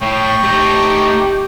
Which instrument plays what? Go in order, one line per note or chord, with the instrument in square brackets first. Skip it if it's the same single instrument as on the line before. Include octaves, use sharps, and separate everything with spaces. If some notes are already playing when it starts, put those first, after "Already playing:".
[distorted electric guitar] A2 [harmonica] G5 C#6
[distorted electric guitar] A3 D#4 [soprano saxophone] G4